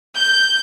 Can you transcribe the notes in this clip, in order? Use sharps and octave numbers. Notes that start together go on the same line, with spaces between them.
G6